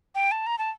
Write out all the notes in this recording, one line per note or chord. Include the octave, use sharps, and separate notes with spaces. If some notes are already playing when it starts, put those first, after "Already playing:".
G5
A5
A#5
A5